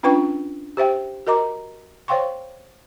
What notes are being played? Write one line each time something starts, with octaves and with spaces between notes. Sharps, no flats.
C#4 D4 F4 B4 G5 C#6
G4 C5 E5 G5
F#4 A#4 D#5 A#5 D6
C5 C#5 F5 G5 C6 C#6